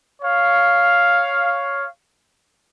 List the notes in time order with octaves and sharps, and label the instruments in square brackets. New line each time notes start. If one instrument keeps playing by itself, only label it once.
[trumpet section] C#5 F5